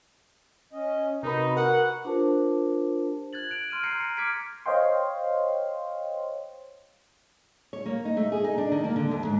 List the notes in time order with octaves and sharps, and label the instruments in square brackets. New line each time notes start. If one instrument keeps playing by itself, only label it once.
[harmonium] C#4 D#5
[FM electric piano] C3 A#4 B5 [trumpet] D#4 [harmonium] F#4 B4
[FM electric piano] A#4 [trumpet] F#5
[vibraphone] D4 F4 G4 A#4 C5 A5
[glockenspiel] F#6 G#6 A6 F#7
F#6 D7 F7
C6 F6 D7 D#7
A#5 C6 G6 A#6 C7 C#7
A#5 C#7
D6 F6 G#6 B6 D7
[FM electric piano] C5 C#5 D#5 F5 G5 C6
[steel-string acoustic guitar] C#5
A#3
D#4
A3
G#4
D#4
D4
D#3
A#3
D3
D#2
G#2